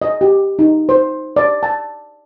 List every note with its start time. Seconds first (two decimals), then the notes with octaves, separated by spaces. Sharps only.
0.02 D#5
0.21 G4
0.59 D#4
0.89 C5
1.36 D5
1.63 A5